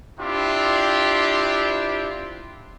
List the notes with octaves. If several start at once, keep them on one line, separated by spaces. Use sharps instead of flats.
C4 D4 E4 F4 G4